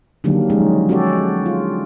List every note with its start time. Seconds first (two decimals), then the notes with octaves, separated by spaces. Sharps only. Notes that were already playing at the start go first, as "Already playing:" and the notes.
0.24 D3 D#3 F#3 G3 A#3 D4
0.50 F3 F#3 G#3 C#4 D#4
0.89 C#4 F#4 G4 A4 D5
1.46 F4